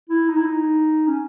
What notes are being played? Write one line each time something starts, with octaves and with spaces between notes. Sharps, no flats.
E4
D#4
E4
D#4
C#4